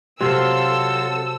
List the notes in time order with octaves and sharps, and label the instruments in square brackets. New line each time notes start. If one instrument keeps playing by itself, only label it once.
[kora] C3 [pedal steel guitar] F#3 C4 F4 [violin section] A4 E6 [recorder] C6